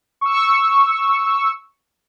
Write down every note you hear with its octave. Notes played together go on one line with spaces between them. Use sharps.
C#6 E6